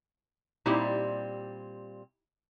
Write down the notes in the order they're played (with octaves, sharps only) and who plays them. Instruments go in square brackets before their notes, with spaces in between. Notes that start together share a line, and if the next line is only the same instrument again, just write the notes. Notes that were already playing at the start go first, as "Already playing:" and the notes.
[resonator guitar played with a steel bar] A#2 G3 C4 [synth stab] D#4 E4 G4